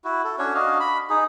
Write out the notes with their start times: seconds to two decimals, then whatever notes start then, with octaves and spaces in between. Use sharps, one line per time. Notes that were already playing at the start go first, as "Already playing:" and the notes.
0.04 E4 F#4
0.24 A4
0.38 C#4 D4 F#4 C#5
0.55 D4 F#4 D#5 F5
0.80 B5
1.10 D#4 G#4